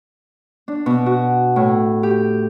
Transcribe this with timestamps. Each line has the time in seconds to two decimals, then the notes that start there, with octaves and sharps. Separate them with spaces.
0.68 D4
0.86 B2
1.06 F#4
1.56 A2
2.03 G4